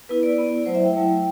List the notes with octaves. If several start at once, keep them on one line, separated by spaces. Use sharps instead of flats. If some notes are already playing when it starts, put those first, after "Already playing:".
B3 E4 B4
D5
B3 E4
F#3 A3 E4 C5
E5
G5
F#3 A3 E4